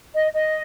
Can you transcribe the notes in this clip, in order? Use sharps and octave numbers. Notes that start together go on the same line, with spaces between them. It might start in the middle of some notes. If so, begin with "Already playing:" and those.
D#5
D#5